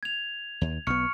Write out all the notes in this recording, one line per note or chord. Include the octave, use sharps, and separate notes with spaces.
G#6 F7
D#2
B1 B3 C#6 F6 C#7